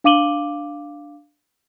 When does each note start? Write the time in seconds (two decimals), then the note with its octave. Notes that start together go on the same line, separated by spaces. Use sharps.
0.04 D4 F5 D6 D#7 F#7 G7